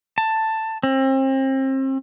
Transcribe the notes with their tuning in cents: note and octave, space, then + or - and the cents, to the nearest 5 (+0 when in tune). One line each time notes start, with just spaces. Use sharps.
A5 +10
C4 +35